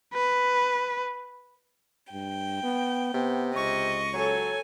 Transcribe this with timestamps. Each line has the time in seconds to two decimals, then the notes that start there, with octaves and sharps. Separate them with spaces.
0.14 B4
2.13 G2 G5
2.63 B3
3.14 C3 B3
3.56 C#2 D#5 C#6
4.14 F#3 A4 C#5 G#5